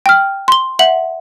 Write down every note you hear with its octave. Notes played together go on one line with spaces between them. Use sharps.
G5 F6
C6 G7
E5 F#5 F#7